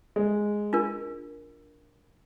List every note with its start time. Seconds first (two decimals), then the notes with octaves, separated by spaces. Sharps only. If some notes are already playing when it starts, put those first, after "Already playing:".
0.16 G#3
0.73 D4 F4 A#4